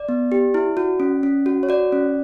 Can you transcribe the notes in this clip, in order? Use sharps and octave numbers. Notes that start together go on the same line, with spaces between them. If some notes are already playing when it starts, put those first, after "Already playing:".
Already playing: D5
B3
G4
E4
F#4
C#4
C#4
F#4
C#5
F#4 D5
C#4